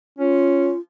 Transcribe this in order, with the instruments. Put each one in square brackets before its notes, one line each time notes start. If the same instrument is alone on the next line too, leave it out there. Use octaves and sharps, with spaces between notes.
[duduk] C#4 [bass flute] F4